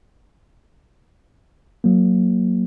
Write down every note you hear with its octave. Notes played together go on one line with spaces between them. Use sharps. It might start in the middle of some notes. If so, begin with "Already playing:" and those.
F#3 A#3